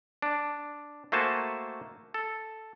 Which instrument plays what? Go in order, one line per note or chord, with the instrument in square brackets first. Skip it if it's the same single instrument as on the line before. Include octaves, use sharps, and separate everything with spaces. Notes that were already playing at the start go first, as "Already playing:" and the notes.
[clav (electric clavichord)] D4
A3 A#3 F#4 C5 G#5 A5
A4